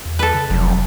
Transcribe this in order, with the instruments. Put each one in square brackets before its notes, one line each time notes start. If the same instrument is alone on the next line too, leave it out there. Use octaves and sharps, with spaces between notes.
[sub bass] E2
[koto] A4 B4
[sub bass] C#3
[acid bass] F1 [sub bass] F#3